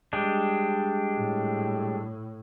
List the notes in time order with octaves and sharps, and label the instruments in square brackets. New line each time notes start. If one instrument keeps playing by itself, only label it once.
[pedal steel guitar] G3 G#3 D4
[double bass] A2